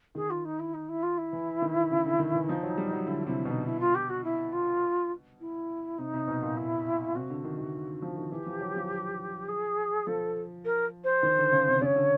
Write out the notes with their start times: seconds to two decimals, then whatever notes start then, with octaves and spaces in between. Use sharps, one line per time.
0.15 D#3 G#4
0.30 F4
0.45 D#4
0.59 E4
0.74 D#4
0.88 E4
1.03 F4
1.18 E4
1.33 E3
1.62 D#3
1.91 C#3
2.06 D3
2.19 D#3
2.34 E3
2.49 F3 D#4
2.63 F#3
2.77 G3
2.93 F#3
3.06 D3 E4
3.27 C3 E4
3.45 B2 E4
3.50 D#4
3.65 E4
3.80 F4
3.95 G4
4.09 F#4
4.24 E4
4.52 F4
5.40 E4
5.98 C3 D#4
6.14 C3
6.28 B2
6.42 A#2
6.57 E4
7.15 C3 F#4
7.30 D3
7.44 D#3
7.58 D#3
8.02 F3
8.17 D#3
8.31 E3 G4
8.46 F3
8.61 F#3
8.76 F3
9.48 G#4
10.07 F3 A4
10.65 A#4
11.04 C5
11.23 D#3
11.38 D3
11.52 C#3
11.67 C3
11.81 C#3 C#5 D5
11.96 D3